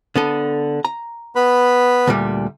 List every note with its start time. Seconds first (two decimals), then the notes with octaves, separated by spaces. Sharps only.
0.16 D3 B3 A4
0.85 A#5
1.35 B3 B4 B5
2.07 D2 A#2 G3